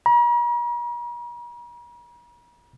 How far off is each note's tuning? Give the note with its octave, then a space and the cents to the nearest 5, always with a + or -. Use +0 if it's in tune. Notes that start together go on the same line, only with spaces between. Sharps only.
A#5 +45